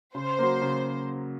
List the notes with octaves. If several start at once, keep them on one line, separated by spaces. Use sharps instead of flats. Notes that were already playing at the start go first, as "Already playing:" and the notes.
C#3 C5
F#3 A#3
C#3